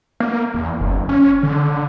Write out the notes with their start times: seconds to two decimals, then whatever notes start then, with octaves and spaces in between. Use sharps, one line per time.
0.20 A#3
0.55 E2
0.81 F#1
1.09 C#4
1.43 D3